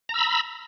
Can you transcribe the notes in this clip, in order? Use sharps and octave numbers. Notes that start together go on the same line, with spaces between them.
A#5 B5 E6